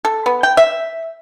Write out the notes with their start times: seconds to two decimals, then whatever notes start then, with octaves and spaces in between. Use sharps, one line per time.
0.05 A4
0.26 B3
0.43 G5
0.57 E5